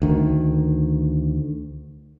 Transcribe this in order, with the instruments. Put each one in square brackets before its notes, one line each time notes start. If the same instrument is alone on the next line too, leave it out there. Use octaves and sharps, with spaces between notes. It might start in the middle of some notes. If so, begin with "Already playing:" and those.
[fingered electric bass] D2 D#3